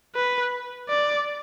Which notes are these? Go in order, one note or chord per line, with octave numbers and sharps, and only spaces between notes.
B4
D5